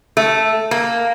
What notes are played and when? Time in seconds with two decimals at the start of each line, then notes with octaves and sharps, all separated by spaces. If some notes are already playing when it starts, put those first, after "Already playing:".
0.17 A3
0.71 A#3